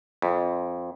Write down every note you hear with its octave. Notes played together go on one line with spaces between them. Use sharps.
F2